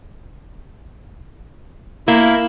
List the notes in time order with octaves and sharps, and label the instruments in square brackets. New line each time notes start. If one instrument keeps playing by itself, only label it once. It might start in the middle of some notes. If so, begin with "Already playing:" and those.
[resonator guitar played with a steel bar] A#3 [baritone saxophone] E4